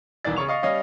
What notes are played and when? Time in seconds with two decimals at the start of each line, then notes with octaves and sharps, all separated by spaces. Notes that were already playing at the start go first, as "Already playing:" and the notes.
0.25 E1 C2 D#3 E3 D5 A6
0.37 C#3 C#5 C#6 F7
0.48 D#5 F5 C#6
0.63 G3 C#4 C#5 D#5 F5